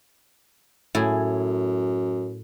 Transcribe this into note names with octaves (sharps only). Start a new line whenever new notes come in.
F#2 A2 E4 G#4